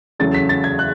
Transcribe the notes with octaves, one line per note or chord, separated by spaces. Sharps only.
E2 C#3 F#3 A3 A6
B6
A6
G#6
F#6